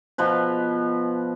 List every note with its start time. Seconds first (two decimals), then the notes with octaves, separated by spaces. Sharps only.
0.18 B2 F3 B4